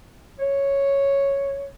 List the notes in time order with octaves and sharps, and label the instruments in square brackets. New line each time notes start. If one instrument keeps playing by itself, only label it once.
[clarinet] C#5